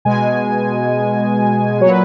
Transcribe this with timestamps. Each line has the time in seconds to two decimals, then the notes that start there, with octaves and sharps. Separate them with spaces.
0.05 B2 G#3 G#5
1.81 F#3 C#5
1.85 A#2 B4